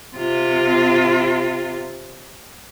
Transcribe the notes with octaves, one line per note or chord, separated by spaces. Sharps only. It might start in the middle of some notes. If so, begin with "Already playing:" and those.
C3 F4